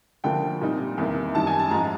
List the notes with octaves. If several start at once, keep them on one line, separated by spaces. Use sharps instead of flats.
D2 D3 F3 A#3 G5
A#2 G3 C4 D#4
E2 C3 D#3 G3 A#3
F#2 D#3 G3 A5
G#5
A5
G#2 F3 G#3 A#5